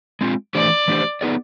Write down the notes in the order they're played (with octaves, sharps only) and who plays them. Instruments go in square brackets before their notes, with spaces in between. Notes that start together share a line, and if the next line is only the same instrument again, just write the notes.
[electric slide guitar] G#3 C4 F4
[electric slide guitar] E3 A3 D4 G4 C5 [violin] D5
[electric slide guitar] E3 A3 D4 G4 C5
B3 D#4 G#4 B4 D5